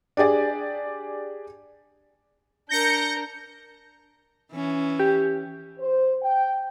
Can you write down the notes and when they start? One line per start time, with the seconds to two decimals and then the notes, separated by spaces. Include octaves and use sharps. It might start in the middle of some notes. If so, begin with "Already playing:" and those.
0.17 D4 G4 G#4 D5
2.69 D4 A#4 G6 A#6 C#7
4.52 E3 C#4
5.00 G4
5.79 C5
6.22 G5